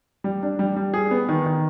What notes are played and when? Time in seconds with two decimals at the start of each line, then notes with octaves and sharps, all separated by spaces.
0.24 G3
0.43 D4
0.59 G3
0.76 G3
0.94 G#4
1.11 B3
1.29 D#3
1.46 D#3